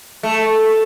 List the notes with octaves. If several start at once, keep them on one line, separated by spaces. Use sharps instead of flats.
A3